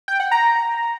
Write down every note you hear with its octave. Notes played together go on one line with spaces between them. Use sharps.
G5
F#5
A#5